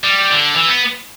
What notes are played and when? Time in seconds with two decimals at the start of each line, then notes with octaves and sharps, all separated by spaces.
0.04 G3
0.30 D3
0.55 E3
0.68 B3